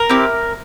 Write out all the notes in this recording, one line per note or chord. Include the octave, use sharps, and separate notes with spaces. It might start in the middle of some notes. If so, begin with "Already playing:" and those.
Already playing: A#4
C4 E4 G4